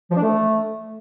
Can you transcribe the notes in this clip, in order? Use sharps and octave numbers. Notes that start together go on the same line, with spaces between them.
F3
D4
A3